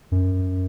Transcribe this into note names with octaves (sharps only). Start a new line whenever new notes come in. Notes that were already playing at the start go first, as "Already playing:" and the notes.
F#2